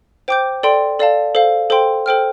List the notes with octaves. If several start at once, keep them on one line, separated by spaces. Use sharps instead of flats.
C5 G5 D6 G6
A4 D5 G5 C6
A4 D5 F5 A5
A4 C5 F5
A4 C5 G5 C6
A4 C5 G5 F6